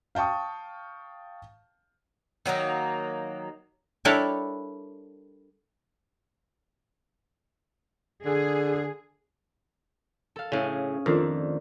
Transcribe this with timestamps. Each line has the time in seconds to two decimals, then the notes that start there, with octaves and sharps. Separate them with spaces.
0.15 F5 G5 A5 C#6 D#6
2.46 D#3 F#3 A#3 D#4
4.05 G3 D4 E4 A4 A#4 C#5
8.25 D3 G#4
10.36 A4 F5
10.52 A2 C#3 C#4 G#4
11.06 F2 D#3 A3 D4 F4 A4 A#4